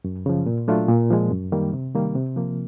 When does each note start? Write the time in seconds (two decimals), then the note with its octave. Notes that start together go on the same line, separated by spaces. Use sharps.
0.04 F#2
0.26 C#3 F3
0.46 A#2
0.68 F#3 A3 D4 F4
0.89 A#2
1.10 F3 G#3
1.31 F#2
1.52 D#3 G3 A#3
1.73 C3
1.95 D#3 G3 A#3
2.15 C3
2.36 F3 A#3